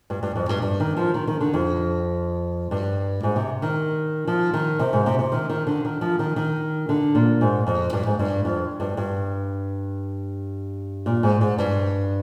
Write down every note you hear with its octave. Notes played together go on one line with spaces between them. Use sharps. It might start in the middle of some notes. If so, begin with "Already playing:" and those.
G2
G2
F2
G2
G2
D#3
F3
D#3
D#3
D3
F2
G2
G#2
C3
D#3
F3
D#3
C3
G#2
C3
C3
D#3
D#3
D3
D#3
F3
D#3
D#3
D3
A#2
G#2
F2
G2
G#2
G2
F2
G2
G2
A#2
G#2
G#2
G2